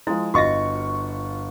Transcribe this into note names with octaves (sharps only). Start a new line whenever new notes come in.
F3 G#3 E4
G1 F4 F#4 D#5 E5 C#6